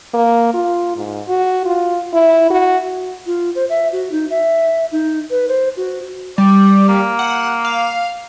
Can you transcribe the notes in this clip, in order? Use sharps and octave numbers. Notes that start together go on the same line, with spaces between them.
A#3
F4
G#2
F#4
F4
E4
F#4
F4
C5
E5
F#4
D#4
E5
D#4
B4
C5
F#4
G3 D5
A#3
F#5
F5